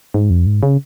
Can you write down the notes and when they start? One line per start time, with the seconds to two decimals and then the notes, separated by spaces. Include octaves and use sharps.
0.14 G#2
0.30 F2
0.46 G#2
0.63 C#3